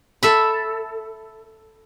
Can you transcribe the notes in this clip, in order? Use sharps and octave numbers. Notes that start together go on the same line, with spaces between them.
A4 E5 B5